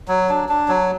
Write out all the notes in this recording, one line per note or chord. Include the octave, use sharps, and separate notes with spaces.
F#3
D4
D4
F#3